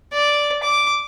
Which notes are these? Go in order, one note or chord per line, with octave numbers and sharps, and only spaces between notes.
D5
D6